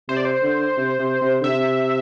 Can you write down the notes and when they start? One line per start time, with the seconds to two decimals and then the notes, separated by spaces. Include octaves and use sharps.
0.09 C3 C5
0.17 D5
0.25 C5
0.43 D3
0.77 C3
0.99 C3
1.21 C3
1.41 D3
1.44 C3 E5